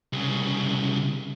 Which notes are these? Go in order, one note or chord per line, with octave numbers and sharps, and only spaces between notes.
C2 C#3